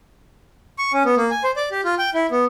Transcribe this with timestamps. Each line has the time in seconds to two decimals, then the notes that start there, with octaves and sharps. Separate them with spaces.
0.78 C#6
0.93 C#4
1.05 B3
1.17 A#3
1.31 G#5
1.44 C5
1.56 D5
1.71 G4
1.84 F4
1.99 G5
2.14 E4
2.31 B3